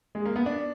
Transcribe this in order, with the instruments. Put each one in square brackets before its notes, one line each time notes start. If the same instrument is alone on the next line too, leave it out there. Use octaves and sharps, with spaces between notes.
[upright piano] G#3
A#3
B3
D4